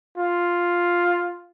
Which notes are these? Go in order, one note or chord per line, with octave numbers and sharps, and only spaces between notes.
F4